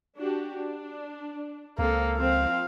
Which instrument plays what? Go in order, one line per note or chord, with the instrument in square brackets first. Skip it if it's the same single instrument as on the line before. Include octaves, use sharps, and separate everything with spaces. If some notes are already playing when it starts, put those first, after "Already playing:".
[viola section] D4 F#4 G4
D4
[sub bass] C#2 [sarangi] A#3 [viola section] C4 A4 F5
[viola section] F3 C4 [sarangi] F5